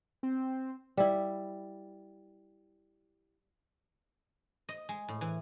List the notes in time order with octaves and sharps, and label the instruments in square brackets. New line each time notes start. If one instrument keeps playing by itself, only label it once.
[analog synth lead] C4
[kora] G3 E4
[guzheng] D#5
G#3
A2
E3